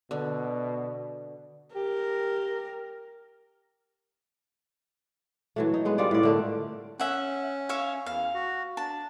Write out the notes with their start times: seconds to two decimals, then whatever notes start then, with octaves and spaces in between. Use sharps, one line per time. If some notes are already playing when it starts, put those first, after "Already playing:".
0.11 B2 D3
1.75 G4 A#4
5.56 E3 F#3 A3
5.74 D#4
5.85 G#3 B3
5.98 G3 F4 D5
6.11 A2 D5
6.23 D3 A3 A#4
7.00 C#4 E5 F#5
7.69 C#5 E5 F5
8.06 E2 F5
8.34 F#4
8.77 D4 A5